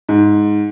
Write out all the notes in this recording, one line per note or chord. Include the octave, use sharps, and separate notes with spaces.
G#2